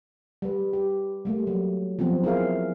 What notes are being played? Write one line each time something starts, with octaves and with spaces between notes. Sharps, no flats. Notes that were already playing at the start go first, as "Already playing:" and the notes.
G3 B4
G4
G3 A3 A#3
F#3
F3 F#3 B3 C4
E4 G#4 A#4 F5